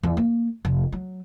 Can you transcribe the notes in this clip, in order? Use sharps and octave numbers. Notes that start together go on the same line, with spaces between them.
E2
A#3
F1
F#3